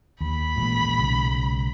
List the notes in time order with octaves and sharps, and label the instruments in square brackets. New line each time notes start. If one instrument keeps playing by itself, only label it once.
[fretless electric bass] D#2 [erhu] B5
[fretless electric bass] A1 A#2 G#3
B1 C#3 G#3